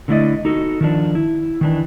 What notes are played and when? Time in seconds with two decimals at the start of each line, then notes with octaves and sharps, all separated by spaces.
0.08 D3 F#3 A3 E4 D5 D#5
0.45 D#4 F#4 A4
0.81 D#3 F3 D4
1.15 E4
1.61 D#3 E3 D4